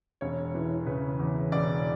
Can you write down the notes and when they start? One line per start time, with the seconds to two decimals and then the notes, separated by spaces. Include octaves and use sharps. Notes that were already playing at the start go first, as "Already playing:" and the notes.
0.21 E1 C#5
0.55 E3
0.86 C#3 B4
1.19 E2
1.52 E1 D5